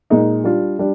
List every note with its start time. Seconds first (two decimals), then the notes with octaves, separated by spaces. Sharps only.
0.10 A#2 G#3 D#4
0.44 G3 D4 F4
0.79 G3 D4